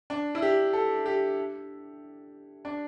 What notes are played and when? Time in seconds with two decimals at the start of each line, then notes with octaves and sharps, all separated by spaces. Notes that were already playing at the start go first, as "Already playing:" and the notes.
0.10 D4
0.35 E4
0.42 G4
0.73 A4
1.06 G4
2.65 D4